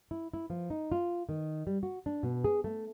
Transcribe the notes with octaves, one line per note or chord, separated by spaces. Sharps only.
E4
E4
F3
D#4
F4
D#3
G3
F#4
D4
B2
G#4
A3